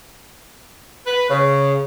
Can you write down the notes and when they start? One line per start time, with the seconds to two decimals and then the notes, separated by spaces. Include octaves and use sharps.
1.06 B4
1.29 C#3